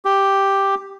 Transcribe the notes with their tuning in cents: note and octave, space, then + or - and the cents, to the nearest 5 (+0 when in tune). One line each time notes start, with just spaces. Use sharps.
G4 +0